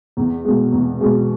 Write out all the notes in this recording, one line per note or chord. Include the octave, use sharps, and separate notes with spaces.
E2
B2 G#3
E2
B2 G#3